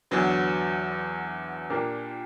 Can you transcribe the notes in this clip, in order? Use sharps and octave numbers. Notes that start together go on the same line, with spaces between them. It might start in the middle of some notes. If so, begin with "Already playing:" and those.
E2 D3 F#3 B3
A#2 A#3 D4 G4 A#4